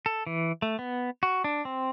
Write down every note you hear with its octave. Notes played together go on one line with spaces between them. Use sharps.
A4
E3
A3
B3
F#4
D4
C4